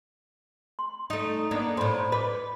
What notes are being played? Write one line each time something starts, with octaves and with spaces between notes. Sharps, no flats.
C6
A3 D#4
A#3 B3 D4 D5
A2 C4 D5 B5 C6
B4 D#5 D6